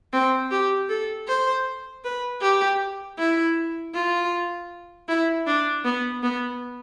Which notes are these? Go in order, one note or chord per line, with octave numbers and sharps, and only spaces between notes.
C4
G4
A4
C5
B4
G4
E4
F4
E4
D4
B3
B3